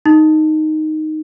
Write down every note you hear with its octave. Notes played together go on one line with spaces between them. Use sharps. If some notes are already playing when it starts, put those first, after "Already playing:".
D#4